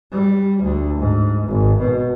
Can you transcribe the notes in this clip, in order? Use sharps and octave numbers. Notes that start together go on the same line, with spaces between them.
G3
D2
G#2
G#1
B2